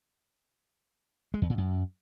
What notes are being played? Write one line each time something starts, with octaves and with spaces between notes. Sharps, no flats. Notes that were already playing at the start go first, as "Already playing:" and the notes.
G#3
E2
A#2
F#2